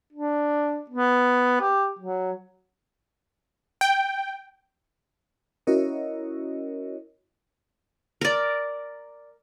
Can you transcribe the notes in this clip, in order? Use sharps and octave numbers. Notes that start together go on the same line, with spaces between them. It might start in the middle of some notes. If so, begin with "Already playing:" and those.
D4
B3
G4
F#3
G5
C#4 E4 F#4 A#4 C#5 D#5
A#4 D5